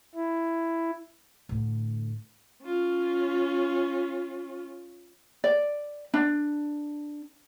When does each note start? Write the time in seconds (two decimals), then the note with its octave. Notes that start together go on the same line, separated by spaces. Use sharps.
0.15 E4
1.49 A2 D3
2.64 C#4 F4
5.44 D5
6.14 D4